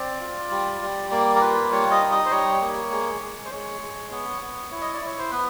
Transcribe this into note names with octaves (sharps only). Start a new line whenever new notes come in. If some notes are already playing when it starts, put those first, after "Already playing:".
Already playing: C4 D5
F4
G3
G3
A#3 D5
A#4
F4 B4
G3 C#5
D#5
D#4
D#5
C5
G3 C#5
A#3
G#3
G#3
C5
G#3 C#5
G#3
B3 C#5
B3
E4
D#5
D5
E4 C#5
C5
B3 B4